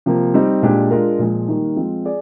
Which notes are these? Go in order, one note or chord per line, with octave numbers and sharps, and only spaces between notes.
C3 F3 A#3
G3 C4 D#4
A#2 G#3 D4 G4
G#3 D4 F4 A#4
A#2 F3 G#3
D#3 G3 A#3 D#4
F3 G#3 C4
G#4 D5